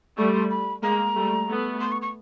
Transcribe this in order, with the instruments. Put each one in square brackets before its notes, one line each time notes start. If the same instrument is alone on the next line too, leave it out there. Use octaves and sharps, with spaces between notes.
[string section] G3 A3 [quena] C#6
[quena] C6
B5
[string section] G#3 A#3 [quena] A#5
[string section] G3 A3
A3 B3
[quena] C6
C#6
C#6